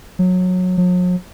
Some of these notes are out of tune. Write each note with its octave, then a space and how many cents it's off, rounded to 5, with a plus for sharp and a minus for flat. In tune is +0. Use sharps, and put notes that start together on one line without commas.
F#3 -20
F#3 -45